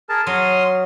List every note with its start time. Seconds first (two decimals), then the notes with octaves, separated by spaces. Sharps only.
0.09 G#4 A#4 A5
0.27 F#3 C6 D#6 F6